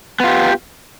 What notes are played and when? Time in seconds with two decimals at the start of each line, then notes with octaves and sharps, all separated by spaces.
0.20 B3
0.24 F4
0.28 G4